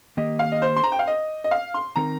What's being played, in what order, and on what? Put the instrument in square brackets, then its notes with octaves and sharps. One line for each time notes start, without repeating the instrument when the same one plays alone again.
[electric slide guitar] D#3 A#3 G4 [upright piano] D#5
[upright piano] F5
D#5
C5
C6
A#5
G5
F5
D#5
D#5
F5
C6
[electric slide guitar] D#3 C4 D#4 A#4 [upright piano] A#5